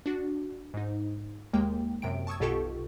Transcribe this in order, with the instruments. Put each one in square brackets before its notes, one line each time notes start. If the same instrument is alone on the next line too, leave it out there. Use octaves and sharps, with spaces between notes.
[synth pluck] D4 F#4
G#2 D#4
D#2 G#3 A#3 G5
F#2 C3 G5 D7
A5 C#6 D#6 E6 G#6
B1 B2 F4 G4 A4 C#6